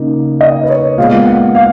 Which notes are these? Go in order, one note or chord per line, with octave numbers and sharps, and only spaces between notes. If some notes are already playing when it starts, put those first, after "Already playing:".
Already playing: C#3 A#3 D#4
D#5
B4
C#5
A#2 G#3 B3 F5
F#5
F5